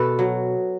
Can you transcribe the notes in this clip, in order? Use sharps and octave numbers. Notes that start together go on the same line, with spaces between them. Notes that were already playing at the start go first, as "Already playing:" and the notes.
Already playing: B2 A4 B4
F#3